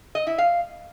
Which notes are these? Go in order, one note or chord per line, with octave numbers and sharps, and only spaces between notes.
D#5
E4
F5